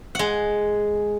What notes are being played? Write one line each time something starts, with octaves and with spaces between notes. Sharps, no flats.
G#3 F#5